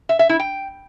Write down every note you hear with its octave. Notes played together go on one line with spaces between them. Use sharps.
E5
E5
E4
G5